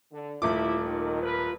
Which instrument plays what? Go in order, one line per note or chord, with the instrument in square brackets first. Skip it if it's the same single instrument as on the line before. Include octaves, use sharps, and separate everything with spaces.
[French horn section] D3
[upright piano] D#1 A3 D6 [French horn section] D2 E4 [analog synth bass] F4
[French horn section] D#3
A#4 B4